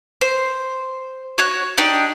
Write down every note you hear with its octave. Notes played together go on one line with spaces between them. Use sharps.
C5
F#4 C#5 F#6
D4 D#4 G4 G5